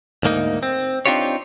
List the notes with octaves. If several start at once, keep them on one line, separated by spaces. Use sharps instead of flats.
D2 G#2 A#3 D#4
C4
C4 D4 D#4 F4 G4 C#5